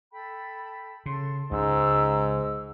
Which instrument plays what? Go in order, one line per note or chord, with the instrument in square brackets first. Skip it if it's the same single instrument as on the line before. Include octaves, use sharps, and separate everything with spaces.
[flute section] A4 G5 B5
[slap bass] C#3 [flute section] A4 C6
[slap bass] C#2 [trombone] G#2 [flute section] A#5 E6